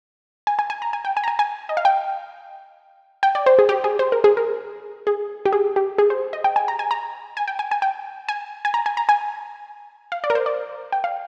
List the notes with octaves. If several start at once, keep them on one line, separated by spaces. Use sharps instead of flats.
G#5
G#5
G#5
A#5
G#5
G5
G#5
A#5
G#5
G#5
D#5
F5
G5
G5
D5
C5
G#4
G4
G#4
C5
A#4
G#4
A#4
G#4
G4
G#4
G4
G#4
C5
D#5
G5
G#5
A#5
G#5
A#5
G#5
G5
G#5
G#5
G5
G#5
G#5
A#5
G#5
A#5
G#5
F5
D5
A#4
C5
D5
G5
F5